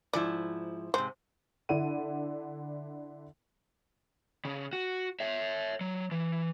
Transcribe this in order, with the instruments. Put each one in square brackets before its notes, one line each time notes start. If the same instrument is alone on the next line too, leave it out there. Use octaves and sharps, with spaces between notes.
[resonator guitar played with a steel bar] G#2 F3 E4 [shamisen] D5
[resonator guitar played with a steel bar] G#2 C3 [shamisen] C5
[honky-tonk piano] D3 D4 E4 F#5 D#7
[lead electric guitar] C#3
F#4
C#5 E5
F#3
E3